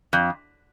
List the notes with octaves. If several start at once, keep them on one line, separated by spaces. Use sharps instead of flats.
F2